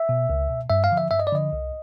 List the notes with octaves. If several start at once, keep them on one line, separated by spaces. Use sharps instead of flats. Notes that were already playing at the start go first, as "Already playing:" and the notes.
Already playing: E5
B2
C#2
B2
G2 E5
F5
D3 F3
E5
G2 E5
D#5
D5
D3 F3 D#5
C2